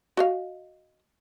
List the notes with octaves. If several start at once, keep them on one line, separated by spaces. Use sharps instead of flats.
F#4 D#5 F5